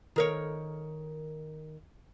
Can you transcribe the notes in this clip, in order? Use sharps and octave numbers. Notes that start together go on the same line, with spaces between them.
D#3 A#4 C#5